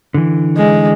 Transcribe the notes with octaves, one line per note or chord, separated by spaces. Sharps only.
D3 E3
G#3